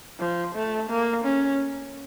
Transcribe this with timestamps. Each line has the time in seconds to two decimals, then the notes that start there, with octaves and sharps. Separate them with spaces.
0.20 F3
0.55 A3
0.90 A#3
1.25 C#4